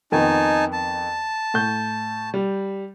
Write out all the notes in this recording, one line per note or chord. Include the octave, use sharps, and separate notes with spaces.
F2 D#3 B3 D#4 G#5 A5
A5
A2 G6
G3